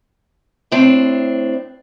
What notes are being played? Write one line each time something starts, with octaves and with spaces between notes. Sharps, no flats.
A2 C4 D4